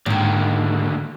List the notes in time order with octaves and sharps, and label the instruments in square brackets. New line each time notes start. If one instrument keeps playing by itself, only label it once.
[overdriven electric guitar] D#2 D3 [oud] G#2 D#3